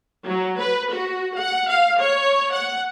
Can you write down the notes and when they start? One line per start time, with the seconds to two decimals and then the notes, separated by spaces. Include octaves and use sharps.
0.25 F#3
0.60 B4
0.91 F#4
1.38 F#5
1.69 F5
1.99 C#5
2.53 F#5